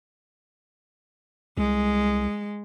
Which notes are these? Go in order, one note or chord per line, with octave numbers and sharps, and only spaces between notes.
C2 G#3